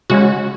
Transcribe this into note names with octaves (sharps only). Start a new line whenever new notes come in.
C#3 G#3 C#4 F#4